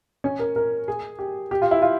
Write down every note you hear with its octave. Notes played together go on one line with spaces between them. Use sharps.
C#4
A#4
A#4
G#4
G4
G4
F4
E4
F4